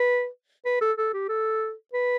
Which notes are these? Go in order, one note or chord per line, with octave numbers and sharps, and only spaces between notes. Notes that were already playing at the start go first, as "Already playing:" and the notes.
Already playing: B4
B4
A4
A4
G4
A4
B4